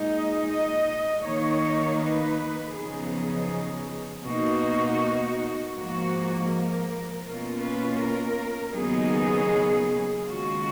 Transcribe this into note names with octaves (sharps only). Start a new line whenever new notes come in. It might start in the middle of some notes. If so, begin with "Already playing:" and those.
Already playing: A#2 G#3 D#4
D#5
D#5
D#3 A#3 D#4 C#5
B4
F#2 C#3 F3 B3 D#4 G#4
B2 A#3 D#4 F#4
G#2 F3 A#3 F#4
A#4
B2 A#3 C#4 F4 A#4
B4
A#4
D#2 C#3 F#3 B3 D#4 G#4
D#2 C#3 G#3 C#4 F4 F#4